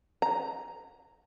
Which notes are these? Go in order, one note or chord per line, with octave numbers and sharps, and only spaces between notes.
A#5